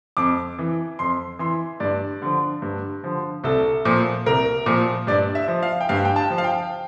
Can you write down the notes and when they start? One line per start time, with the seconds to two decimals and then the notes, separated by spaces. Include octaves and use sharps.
0.17 F2 D6
0.59 E3
0.99 F2 C6
1.39 E3 C6
1.80 G2 D5
2.22 D3 F3
2.62 G2
3.04 D3 F3
3.44 C2 A4
3.85 A#2 F3
4.26 C2 A#4
4.66 A#2 F3
5.07 G2 D5
5.35 E5
5.48 F3
5.63 F5
5.81 G5
5.89 G2 F5
6.05 G5
6.16 A5
6.30 F3
6.38 F5
6.44 G5